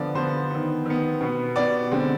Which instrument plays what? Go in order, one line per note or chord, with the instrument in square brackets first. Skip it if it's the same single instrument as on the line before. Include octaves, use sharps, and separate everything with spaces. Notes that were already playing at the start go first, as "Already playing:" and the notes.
Already playing: [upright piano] D3 F3 B3 D5
D3 F3 B3 C5
D#3 B3
D#3 B3
B2 B3
B2 B3 D5
D3 G#3 C4